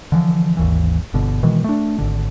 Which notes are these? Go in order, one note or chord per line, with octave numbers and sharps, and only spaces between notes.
D3 E3 F3
G#1 D#2 E3
G1 B2 D3
B2 D#3 E3 G#3
A3 D4
G#1 D3